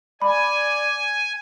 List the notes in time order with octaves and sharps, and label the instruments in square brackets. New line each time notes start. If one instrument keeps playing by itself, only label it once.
[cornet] D5 [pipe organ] G#5 [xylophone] B5